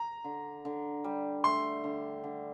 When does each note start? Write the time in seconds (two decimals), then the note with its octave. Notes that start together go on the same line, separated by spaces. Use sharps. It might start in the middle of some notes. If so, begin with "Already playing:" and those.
Already playing: A#5
0.24 D3
0.65 D3
1.04 G3
1.44 A3 C6
1.84 D3
2.24 D3